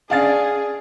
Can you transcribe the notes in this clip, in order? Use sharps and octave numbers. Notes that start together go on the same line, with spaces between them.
C#4 D4 G#4 D5 F5 A5 A6